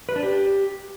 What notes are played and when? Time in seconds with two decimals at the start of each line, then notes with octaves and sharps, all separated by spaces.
0.09 B4
0.16 D4
0.23 G4